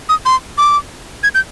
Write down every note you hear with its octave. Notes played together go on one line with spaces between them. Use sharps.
D#6
C6
D6
G#6
G6